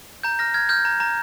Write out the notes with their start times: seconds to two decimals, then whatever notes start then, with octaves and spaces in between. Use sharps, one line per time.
0.23 A#5 G6
0.39 F6 A#6
0.54 F6 G#6
0.69 F6 G6
0.85 A#5
1.00 A#5